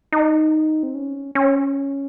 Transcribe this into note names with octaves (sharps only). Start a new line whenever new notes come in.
D#4
C4
C#4
C#4